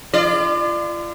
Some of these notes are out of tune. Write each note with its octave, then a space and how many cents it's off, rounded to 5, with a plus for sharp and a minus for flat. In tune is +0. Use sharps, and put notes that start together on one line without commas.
F4 -35 D5 +30